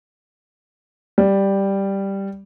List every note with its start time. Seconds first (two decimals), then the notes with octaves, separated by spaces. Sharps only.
1.18 G3